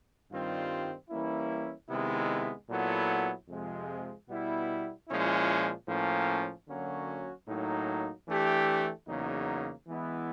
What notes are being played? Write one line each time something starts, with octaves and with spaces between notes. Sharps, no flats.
G2 D#3 G3 C4 F4
E3 G3 A#3 C#4 E4
C3 D#3 G#3 B3 E4
A#2 F#3 B3 E4 A4
F2 C3 F3 G#3
B2 G3 B3 E4
A#2 F3 G#3 C#4 E4
A2 F3 A#3 C#4
D3 F#3 A#3 C#4 F#4
A2 F#3 A#3 D#4
E3 A3 D4 G4
E2 C#3 F#3 A#3 D#4
E3 G#3 B3 E4